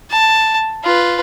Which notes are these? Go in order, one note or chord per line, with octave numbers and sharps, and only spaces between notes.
A5
F4 B4